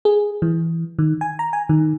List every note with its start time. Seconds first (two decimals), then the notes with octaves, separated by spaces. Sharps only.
0.05 G#4
0.42 E3
0.99 D#3
1.21 G#5
1.39 A#5
1.53 G#5
1.69 D#3